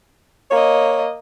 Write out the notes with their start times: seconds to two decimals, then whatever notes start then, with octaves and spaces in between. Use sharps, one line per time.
0.51 A#3 C#5 D#5